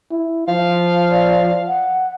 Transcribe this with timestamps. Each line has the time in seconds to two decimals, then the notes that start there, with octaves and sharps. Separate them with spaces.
0.11 E4
0.48 F3 F5
1.11 D5
1.68 F#5